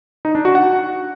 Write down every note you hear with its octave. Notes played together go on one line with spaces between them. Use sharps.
D#4
D4
F#4
F#5